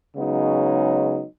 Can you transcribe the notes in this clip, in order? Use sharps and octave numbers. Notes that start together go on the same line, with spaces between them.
C#3 F#3 G#3 B3 D#4